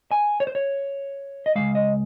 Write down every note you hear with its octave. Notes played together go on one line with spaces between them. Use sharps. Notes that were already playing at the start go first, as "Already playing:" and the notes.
G#5
C#5
C5
C#5
D#5
C#2 C#3 G#3 F5
D#5